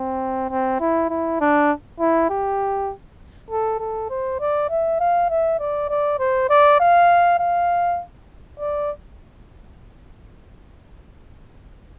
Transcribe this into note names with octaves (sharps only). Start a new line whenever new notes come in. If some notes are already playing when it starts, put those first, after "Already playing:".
Already playing: C4
C4
E4
E4
D4
E4
G4
A4
A4
C5
D5
E5
F5
E5
D5
D5
C5
D5
F5
F5
D5